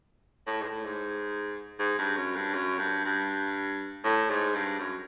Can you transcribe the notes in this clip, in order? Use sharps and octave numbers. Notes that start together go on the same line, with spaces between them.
A2
G#2
A2
G#2
G#2
G2
F#2
G2
F#2
G2
G2
A2
G#2
G2
F#2